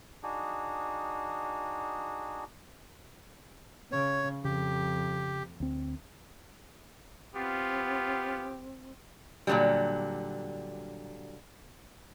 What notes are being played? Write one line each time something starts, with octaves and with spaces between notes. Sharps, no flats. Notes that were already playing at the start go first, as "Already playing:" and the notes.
D4 D#4 F#4 G#4
C#3 C#5
F2 C#3 G4
D2 C4
B3 C4 F4 G4
A#2 D3 D#3 F#3 G3